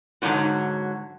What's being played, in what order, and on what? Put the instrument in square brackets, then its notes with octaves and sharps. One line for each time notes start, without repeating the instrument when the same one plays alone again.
[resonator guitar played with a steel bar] G#2 D3 E3 F#3 C4 F#4